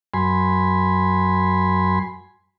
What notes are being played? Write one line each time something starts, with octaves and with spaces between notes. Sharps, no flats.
F#2 G#5 B5 C6